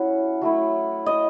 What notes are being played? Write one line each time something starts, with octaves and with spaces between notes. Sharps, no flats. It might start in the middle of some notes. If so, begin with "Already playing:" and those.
Already playing: F#3 C#4 E4 F#5
F#3 A3 E4
D#5